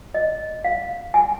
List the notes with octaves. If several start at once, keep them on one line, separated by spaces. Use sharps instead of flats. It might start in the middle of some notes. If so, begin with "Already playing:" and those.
D#5
F5
G#5